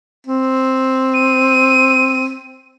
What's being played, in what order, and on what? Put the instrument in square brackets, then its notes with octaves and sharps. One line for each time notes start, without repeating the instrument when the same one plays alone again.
[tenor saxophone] C4
[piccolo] D#7